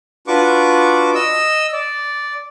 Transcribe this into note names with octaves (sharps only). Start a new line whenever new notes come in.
D4 F4 F#4 B4 C#6 D6
D#5 E6
D5